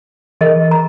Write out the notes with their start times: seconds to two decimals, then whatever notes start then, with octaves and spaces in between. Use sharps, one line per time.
0.41 E3 G#4 A#4 D#5
0.71 A#5